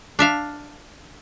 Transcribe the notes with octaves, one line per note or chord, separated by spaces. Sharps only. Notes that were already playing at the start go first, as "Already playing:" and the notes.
D4 E5 F5